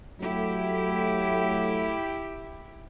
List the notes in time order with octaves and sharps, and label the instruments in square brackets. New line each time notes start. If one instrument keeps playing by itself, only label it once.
[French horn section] F#3 A3 [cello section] E4 G4